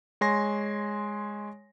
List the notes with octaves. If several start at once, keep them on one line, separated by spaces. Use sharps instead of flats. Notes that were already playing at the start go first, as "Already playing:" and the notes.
G#3 C#5 G#5 C6 A#6